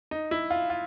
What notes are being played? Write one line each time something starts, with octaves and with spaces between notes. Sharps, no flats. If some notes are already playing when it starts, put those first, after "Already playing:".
D#4
E4
F4
F4